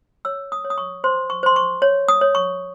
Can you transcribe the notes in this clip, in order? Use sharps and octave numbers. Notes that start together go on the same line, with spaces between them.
C#5 E6
D#6
C#5
D#6
C#6
C5 C6
C#6
C5 C6
C#6
C#5
D#6
C#5
C#6